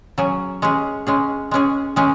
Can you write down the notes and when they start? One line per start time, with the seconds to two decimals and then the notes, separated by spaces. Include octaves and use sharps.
0.18 F#3 C#4 G#4
0.62 G#3 C#4 G#4
1.07 G#3 C#4 G#4
1.51 G#3 C#4 G#4
1.96 G#3 C#4 G#4